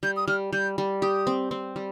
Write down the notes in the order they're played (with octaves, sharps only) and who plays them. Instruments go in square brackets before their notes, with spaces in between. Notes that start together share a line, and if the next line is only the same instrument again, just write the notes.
[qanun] G3 [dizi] G6
[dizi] D#6
[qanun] G3 [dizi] F6
[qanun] G3 [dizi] G6
[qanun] G3
[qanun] G4 [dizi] D#6
[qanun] C4
C4
G3